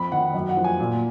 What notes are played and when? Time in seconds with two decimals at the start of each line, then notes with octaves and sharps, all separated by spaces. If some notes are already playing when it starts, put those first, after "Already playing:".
Already playing: F2 B5
0.12 D#3 F#5
0.34 F#2
0.49 F#5
0.57 F3
0.64 G#5
0.80 A#2